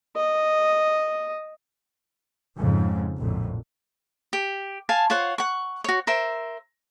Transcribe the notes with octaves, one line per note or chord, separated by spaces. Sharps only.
D#5
F2 G#2 C#3
A#1 F2 A2
G4
F5 G#5 A5
F4 C5 C#5 F#5
F#5 C#6
F#4 C#5
A#4 C5 E5